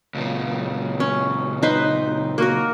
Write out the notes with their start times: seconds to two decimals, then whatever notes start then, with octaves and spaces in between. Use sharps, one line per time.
0.14 C#2 A#2
1.00 C#4
1.63 D#4 B4 C5
2.38 A#3 F#4 A#4